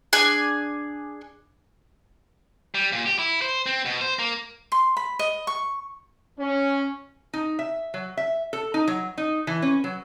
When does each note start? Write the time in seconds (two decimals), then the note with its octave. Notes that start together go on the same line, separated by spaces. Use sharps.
0.13 D4 G#4 G#5
2.75 G3
2.93 A#2
3.06 G4
3.19 E4
3.42 C5
3.66 C4
3.86 B2
4.01 C5
4.19 A#3
4.72 C6
4.97 B5
5.19 D#5
5.47 C#6
6.39 C#4
7.33 D#4
7.59 E5
7.94 F#3
8.17 E5
8.53 A4
8.74 D#4
8.87 F#3
9.18 D#4
9.47 E3
9.62 C#4
9.84 F#3